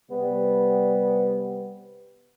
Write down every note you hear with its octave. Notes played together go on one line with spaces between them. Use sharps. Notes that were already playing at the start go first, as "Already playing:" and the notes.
C3 G3 B3